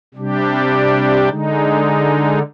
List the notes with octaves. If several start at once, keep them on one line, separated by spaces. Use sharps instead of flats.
C3 G3 D4 G4
D3 G#3 D#4